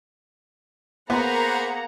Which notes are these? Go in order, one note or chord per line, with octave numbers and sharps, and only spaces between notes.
A#3 B3 G#4 C5 F#5 A#5 B5